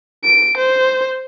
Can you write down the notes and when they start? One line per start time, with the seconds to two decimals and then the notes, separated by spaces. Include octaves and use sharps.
0.24 D7
0.58 C5